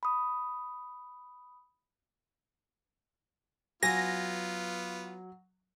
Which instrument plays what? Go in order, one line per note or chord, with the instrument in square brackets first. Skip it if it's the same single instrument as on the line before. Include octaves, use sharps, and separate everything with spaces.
[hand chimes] B5 D#6
[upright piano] F#3 [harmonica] B3 F4 [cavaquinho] G#5 [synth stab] A#6